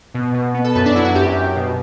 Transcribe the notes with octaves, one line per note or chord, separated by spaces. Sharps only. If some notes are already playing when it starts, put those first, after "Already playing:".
B2
B2
B3
A4
F#2 B4
D4
F#3 E4
F#4
F#2 G4
F#2
B2